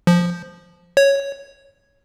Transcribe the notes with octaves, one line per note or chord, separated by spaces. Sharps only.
F3
C#5